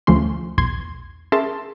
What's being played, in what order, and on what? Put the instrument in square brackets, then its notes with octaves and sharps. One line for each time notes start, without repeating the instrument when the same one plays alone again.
[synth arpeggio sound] D2 F3 A3 C#4 C6
B1 E2 C6 G#6
C#4 G#4 A#4 E5 A5 C6